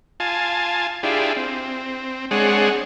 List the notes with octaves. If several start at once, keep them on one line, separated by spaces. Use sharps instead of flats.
F4 G#5 A5
D4 E4 F4 G4 G#4
C4
G#3 C4 D4 G#4 C#5 F#5